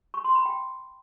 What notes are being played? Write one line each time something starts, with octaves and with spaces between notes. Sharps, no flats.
C#6
C6
B5
G5